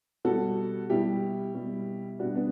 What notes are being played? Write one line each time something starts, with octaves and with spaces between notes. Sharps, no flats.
B2 G3 F#4 A4
B2 G3 E4 G4
B2 G3
B2 G3 D4 F#4
B3 D4